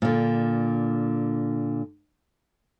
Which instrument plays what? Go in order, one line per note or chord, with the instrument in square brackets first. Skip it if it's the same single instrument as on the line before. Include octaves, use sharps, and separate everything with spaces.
[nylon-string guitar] A#2 D3